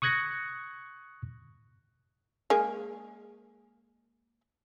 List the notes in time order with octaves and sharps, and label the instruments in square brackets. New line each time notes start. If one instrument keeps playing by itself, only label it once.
[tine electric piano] C#6 D#6 F#6 G#6 A#6 C#7
[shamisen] G#3 A#3 G#4